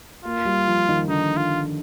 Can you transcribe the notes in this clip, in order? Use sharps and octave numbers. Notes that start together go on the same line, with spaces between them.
A#3 F4
G3
F3
D#3
D3 D#4
F4